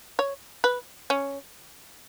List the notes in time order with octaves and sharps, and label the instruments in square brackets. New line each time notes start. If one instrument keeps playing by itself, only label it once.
[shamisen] C#5
B4
C#4